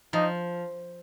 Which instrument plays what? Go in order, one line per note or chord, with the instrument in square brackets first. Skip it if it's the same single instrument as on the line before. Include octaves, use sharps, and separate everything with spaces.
[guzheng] F3 [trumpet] D#4